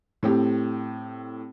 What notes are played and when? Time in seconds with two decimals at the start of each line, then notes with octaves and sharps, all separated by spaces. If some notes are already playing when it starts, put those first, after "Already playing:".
0.23 A2 C4 G4